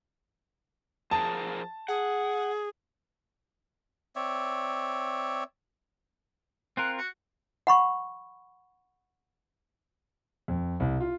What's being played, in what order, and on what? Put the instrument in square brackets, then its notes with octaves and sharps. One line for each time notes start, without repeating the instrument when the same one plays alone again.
[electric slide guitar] F3 G#4 A#4 [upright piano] A5
[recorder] G#4 [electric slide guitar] F#5
[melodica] C4 C#5 D5 E5
[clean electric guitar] C4 F4 A#4 [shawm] F#5
[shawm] F#4
[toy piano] F#5 B5 C#6
[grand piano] F2
C2
F4